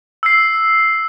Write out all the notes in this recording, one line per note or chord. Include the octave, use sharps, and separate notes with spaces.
E6 C7